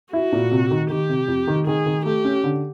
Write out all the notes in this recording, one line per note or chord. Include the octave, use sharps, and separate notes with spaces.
E4 F#4
A#2
C3
D#3
D#3 G4
C3
F2
D#3
D#3 G#4
D#3
A3 G4
C#4
D3